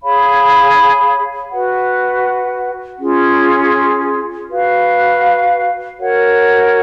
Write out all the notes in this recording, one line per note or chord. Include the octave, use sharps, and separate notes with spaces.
G#4 C#5 F5 B5
F#4 B4 F#5
C#4 F4 G#4
F#4 B4 F5
F#4 A#4 C#5 F#5